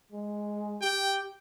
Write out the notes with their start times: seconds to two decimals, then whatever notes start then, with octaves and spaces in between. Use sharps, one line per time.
0.12 G#3
0.82 G4 G5